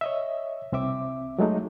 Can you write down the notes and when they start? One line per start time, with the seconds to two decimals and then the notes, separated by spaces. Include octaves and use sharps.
0.01 C#5 D#5 E5
0.72 C2 C4 E5 D6
1.39 F#3 G#3 A3 D#4